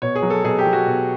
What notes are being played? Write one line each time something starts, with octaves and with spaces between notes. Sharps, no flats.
B2 C#5
G#4
F#3
A4
B2 G#4
G4
F#3
F#4
B2